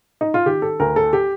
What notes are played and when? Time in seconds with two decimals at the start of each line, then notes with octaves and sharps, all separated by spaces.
0.21 D#4
0.34 F4
0.46 D#3 G4
0.62 A4
0.80 D2 A#4
0.96 A4
1.13 G4